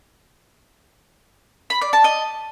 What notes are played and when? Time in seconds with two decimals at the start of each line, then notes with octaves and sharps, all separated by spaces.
1.70 B5
1.81 D5
1.93 A5
2.04 D#5